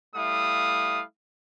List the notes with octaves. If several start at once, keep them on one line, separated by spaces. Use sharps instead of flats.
G3 A3 E4 F5 D#6